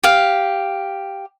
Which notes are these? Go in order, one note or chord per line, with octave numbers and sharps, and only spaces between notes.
G4 F5